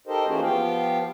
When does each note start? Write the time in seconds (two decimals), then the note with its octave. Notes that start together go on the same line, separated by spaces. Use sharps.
0.07 D#4 G4 A4 A#4 C5 D#5
0.26 E3 A#3 C#4 F#4 G#4 C5
0.42 F3 B3 F4 G4 F5 G5